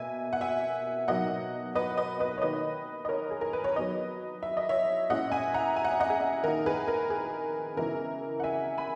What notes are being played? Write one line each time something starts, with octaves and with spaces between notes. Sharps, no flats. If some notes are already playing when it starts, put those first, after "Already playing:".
Already playing: B2 A#3 E5 G#5
F#5
E5 G#5
B2 F#3 A#3 D#4 D#5 F#5
B4 D#5
B4 D#5
B4 D#5
C#5
D#3 A#3 D#4 B4 D#5
D#5
A#4 C#5
G#4
A#4
B4
C#5
F#3 B3 D#4 B4 D#5
E5
D#5
C#5 E5
A#2 G#3 C#4 E4 D#5 F#5
E5 G#5
F#5 A#5
G#5
F#5
E5
D#5 F#5
G#4
D#3 A#3 D#4 A#4
G#4 B4
A#4
G#4
C#3 E3 G#3 B3 E4 A#4
F#5
E5 G#5
G#5 B5